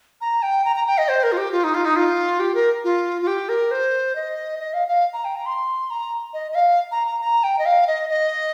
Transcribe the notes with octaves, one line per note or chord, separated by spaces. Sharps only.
A#5
G5
A#5
A#5
G5
D#5
C5
A#4
F4
G4
F4
D#4
F4
D#4
F4
G4
A#4
F4
F4
G4
A#4
C5
D#5
D#5
F5
F5
A#5
G5
A#5
C6
A#5
D#5
D#5
F5
A#5
A#5
A#5
G5
D#5
F5
D#5
D#5